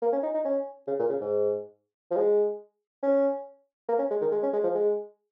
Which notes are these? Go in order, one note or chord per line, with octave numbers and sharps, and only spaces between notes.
A#3
C#4
D#4
D#4
C#4
C#3
A#2
C#3
G#2
F3
G#3
C#4
A#3
C#4
G#3
D#3
G#3
C#4
G#3
F3
G#3